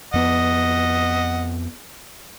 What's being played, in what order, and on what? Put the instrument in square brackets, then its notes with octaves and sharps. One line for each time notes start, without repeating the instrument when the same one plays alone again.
[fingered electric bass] F2 B3 [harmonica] D#5 F#5